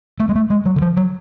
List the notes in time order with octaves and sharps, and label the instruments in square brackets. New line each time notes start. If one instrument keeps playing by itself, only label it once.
[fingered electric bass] A3
G#3
A3
G#3
F#3
D3
F3
F#3